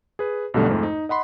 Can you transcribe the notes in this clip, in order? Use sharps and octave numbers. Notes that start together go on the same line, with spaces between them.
G#4 B4
B1 G2 B2 D3 G3 A3
F2 G#2 A3
D#4
D#5 F#5 B5 C6